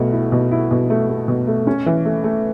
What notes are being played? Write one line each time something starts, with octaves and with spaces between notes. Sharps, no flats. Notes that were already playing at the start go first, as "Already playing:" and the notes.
Already playing: B1 B2 A3
E4
B2
E4
B2
A3
A3
B2
A3
C#4
E3
A3
A3